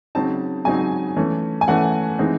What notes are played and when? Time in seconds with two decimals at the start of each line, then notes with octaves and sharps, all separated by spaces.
0.15 C#3 F#3 C4 D#4 A5
0.65 C#3 F#3 C4 D#4 G#5
1.17 E3 A3 C#4
1.61 G#5
1.67 E3 A3 C#4 F#5
2.19 E3 G#3 C4 D#4